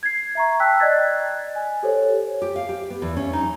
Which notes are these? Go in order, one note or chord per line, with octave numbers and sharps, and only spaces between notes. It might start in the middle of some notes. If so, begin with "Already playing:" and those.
G#6 C7
E5 A#5 C#6
G5 A5 E6 F#6 B6
D5 D#5 F#6 G#6 A6
G#5
G4 A4 C5 C#5
G4
F5
G4
B3
E2
C#4
D#4